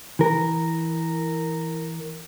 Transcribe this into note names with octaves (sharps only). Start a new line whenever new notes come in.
E3 A#4